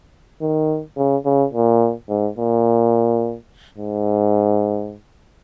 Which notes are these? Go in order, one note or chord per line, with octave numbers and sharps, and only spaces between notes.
D#3
C#3
C#3
A#2
G#2
A#2
G#2